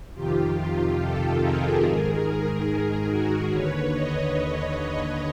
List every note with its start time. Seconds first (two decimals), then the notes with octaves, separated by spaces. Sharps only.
0.14 F2 C3 D#3 F4 G4
0.56 F4 G4
0.98 G4 A4
1.40 G#4 A#4
1.82 G#2 D#3 G#4 A#4
2.23 G#4 A#4
2.66 G#4 A#4
3.07 F#4 G#4
3.49 D#2 D3 B4 C#5
3.92 C#5 D#5